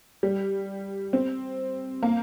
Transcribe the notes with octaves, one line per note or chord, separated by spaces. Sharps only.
G3
C4
A#3